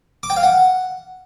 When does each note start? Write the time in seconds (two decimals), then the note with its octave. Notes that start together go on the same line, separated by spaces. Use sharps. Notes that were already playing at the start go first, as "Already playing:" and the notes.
0.23 D6
0.30 G5
0.37 F5
0.43 F#5